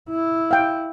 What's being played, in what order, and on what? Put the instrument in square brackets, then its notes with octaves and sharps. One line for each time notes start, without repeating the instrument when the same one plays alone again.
[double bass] E4
[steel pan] F5 G5